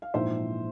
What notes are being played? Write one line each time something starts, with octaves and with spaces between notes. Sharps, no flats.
F5
A#1 G#2 E3 C5 E5